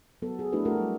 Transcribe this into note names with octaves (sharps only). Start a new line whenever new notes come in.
F#3 B3 A4
G#4
F3 A3 D4 E4 F#4 B4
A3 D4 F#4 G4 A4 A#4
F#3 G3